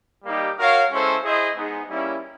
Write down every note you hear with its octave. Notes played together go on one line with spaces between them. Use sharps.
G3 A#3 D#4 G4
F#4 A#4 C#5 F5
G#3 C#4 E4 A4 C5
E4 G#4 C5 D#5
G#3 B3 D#4 G#4
G3 A#3 C#4 E4